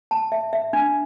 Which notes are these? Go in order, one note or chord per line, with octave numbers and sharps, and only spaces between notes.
A5
E5
E5
D4